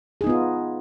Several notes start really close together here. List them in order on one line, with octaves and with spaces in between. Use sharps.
G#4 D#4 B3 F4